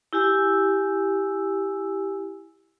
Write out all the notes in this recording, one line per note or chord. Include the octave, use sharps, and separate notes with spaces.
E4 G4 G#5 E6